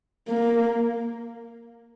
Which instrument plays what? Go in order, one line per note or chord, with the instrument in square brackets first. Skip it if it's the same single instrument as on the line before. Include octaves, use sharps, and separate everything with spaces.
[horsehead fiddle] A#3